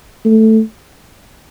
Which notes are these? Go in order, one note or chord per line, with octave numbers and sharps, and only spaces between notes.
A3